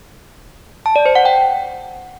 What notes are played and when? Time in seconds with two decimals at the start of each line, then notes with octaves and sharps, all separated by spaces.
0.86 A5
0.96 D5
1.06 C5
1.15 F#5
1.25 G5